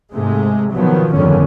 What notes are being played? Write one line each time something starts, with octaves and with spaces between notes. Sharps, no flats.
G#2 C3 G#3 A3
B2 D#3 F3 F#3 B3
G1 F2 G#2 D3 D#3 C#4